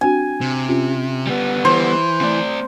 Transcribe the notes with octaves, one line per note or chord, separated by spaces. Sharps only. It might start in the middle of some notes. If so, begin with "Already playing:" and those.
C4 D4 F#4 G#5
C3
C#4 F4 G4
G3 B3
E3 C5
A3 C4 D5